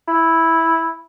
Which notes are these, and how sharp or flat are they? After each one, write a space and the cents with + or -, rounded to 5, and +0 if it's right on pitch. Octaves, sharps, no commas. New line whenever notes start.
E4 -5